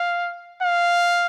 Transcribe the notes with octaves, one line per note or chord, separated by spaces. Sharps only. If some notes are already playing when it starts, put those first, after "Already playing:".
Already playing: F5
F5